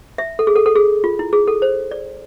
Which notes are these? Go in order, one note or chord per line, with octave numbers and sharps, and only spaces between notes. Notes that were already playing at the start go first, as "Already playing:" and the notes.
E5
A4
G#4
A4
A4
G#4
F4
E4
G#4
A4
C5
D5